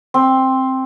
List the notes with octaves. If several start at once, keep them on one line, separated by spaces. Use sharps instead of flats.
C4